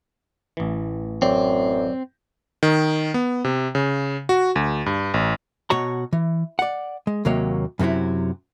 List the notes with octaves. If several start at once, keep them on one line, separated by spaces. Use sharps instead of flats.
A1 E3
F#2 F#3 C4 C#5 D5
D#3
B3
C3
C#3
F#4
D2
G2
A1
B2 F#4 C#5 A#5
E3
D5 F#5
G#3
D#2 C3 F#3 A#3 C#5
F#2 C3 E3 F#3 E4